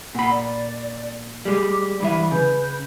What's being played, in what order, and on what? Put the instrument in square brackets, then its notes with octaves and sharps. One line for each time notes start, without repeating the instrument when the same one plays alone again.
[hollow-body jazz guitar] A#2 B5 [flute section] F#5
[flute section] D5
[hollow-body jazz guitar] G3 G#3 [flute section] D6
[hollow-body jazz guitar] G2 E3 E5 [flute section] B5
[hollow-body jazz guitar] C#3 [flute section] B4 G6